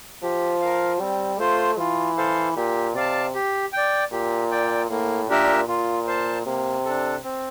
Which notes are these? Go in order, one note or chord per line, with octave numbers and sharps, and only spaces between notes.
F3 G4
A#4 F5
G3 C4
A3 F4 C5
E3 F4
A4 C5 F5
A#2 G4
C3 D5 F5 A5
G4
D5 G5
A#2 G4
D5 G5
A2 A#3
A#2 D4 G4 A#4 E5
A#2 F4
C5 F5 A5
C3 A#3
D4 A4
C4